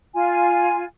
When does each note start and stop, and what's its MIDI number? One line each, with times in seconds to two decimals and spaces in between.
0.14 0.84 65
0.14 0.84 80